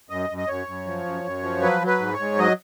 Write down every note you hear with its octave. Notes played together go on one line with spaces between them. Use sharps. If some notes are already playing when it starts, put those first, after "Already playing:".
F#2 D#5
F#2
D#5
F#2 C#5
F#2
F3
F#2
F#2
F3
F#3 B4
F#3
B4
G#2
C#5
G#2
F#3 D#5